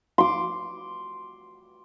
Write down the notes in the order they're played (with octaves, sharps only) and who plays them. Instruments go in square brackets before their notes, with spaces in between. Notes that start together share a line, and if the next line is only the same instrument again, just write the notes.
[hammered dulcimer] C6 D6